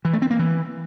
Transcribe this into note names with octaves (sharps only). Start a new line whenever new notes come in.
E3
A3
C4
A#3
E3